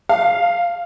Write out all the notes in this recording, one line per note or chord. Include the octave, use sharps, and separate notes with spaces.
F5